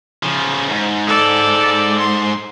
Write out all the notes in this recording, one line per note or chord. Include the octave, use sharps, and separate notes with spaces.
C#3 F3
D2 G#2
A4 D5
C6